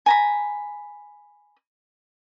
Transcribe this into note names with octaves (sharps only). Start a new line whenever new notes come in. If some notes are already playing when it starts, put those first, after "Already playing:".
G#5 A#5 B5